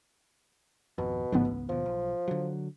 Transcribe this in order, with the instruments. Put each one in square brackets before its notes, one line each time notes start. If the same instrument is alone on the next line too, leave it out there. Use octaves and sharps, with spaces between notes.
[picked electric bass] G#1 F2 [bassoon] B2
[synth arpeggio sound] A1 G#2 B3 [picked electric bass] C#3 F3 F#3
[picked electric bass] C#2
[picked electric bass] D#2 B2 [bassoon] F3
[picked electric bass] B1
D3 F#3